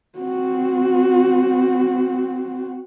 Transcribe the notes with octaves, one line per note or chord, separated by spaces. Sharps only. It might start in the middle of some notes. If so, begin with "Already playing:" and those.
C4 F#4